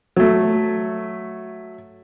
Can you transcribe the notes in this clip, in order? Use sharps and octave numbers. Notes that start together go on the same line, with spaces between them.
F#3 A3